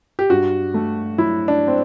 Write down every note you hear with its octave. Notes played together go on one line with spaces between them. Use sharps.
G4
G2 F#4
A3
F#3 E4
D4
C4